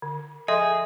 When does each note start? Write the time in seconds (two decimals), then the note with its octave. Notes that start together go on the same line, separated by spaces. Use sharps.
0.02 D3
0.48 F3 G#4 A4 D#5 E5 C6